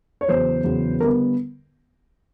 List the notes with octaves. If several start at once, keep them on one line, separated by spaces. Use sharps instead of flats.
C#5
E2 C#3 F#3 B3 C5
E2 C#3 F#3 B3
D3 G3 B3 A#4